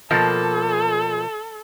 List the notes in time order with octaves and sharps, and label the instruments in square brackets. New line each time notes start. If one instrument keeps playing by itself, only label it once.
[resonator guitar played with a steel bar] B2 F3 A#3 [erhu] A4